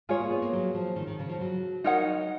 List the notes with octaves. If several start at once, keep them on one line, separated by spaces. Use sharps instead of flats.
G#3 F4 G#4 C#5
A#3
B3
A#3
F#3
F3
D#3
D#3
C#3
F3
F#3
D#4 A#4 C#5 F#5